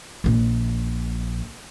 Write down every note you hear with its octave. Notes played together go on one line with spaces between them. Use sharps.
A#1 A#2